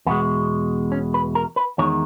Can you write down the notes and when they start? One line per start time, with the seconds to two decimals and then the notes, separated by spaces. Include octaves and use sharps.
0.06 E2 B2 G#3 B3
0.92 C#4
1.14 B4
1.35 A#4
1.56 B4
1.78 E2 D#3 G#3 C#5